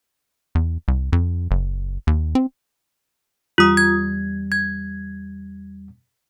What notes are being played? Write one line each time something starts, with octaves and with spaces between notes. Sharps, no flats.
E2
C2
F2
F#1
D#2
C4
E2 G3 F4 D#6
G#6
G#6